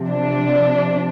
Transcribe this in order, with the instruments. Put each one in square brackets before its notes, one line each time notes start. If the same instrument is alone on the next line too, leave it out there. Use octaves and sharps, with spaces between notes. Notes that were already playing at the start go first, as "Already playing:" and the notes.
Already playing: [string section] C3 F3
D4